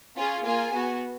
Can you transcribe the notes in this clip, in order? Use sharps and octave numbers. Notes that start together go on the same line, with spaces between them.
C#4 F4 G#4
A#3 F4 G#4 G#5
B3 F#4